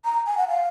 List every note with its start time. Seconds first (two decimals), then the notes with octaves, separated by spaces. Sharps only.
0.05 A#5
0.27 G#5
0.37 F#5
0.49 F5